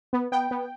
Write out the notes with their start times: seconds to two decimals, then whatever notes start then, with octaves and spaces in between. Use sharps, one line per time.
0.13 B3
0.32 B3 G5
0.51 B3